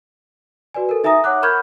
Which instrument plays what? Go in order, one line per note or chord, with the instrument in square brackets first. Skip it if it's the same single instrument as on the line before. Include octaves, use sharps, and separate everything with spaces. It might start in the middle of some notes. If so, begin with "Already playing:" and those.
[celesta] F#4 B4 D5 G#5
A4 A#4
D#4 E5 G#5 A#5 D#6 A#6
C#5 F#5 D6 F#6
A#4 B5 C#6 F6 G6 G#6